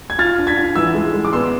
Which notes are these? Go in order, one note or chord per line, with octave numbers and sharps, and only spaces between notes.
G#6
F4 F6 A6
D4
G#6 B6
F4
E3 E6 G#6
G#3
G#3
D6
B3 C6 E6